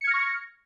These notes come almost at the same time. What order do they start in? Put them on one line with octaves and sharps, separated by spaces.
C#7 G#6 F6 A#6 C#6